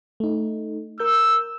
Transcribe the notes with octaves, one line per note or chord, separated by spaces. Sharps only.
A3 D#4
A#4 E6 G6